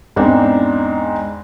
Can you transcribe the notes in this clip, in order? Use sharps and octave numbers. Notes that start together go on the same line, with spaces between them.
E2 G#2 C4 D4 D#4